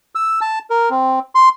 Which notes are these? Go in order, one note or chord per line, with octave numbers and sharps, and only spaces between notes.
E6
A5
A#4
C4
C6